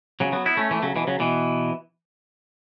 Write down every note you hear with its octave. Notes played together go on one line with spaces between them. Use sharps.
C#3 F#3
F#3 B3
B3 E4
A3 C#4
E3 A3
C#3 F#3
B2 E3
C#3 F#3
B2 E3